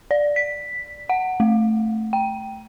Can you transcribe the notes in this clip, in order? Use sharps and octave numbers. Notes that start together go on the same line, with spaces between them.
D5
B6
F#5
A3
G5